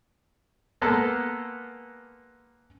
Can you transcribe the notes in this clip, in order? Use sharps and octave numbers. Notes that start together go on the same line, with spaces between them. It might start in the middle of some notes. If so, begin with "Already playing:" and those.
G#3 A#3 B3 A4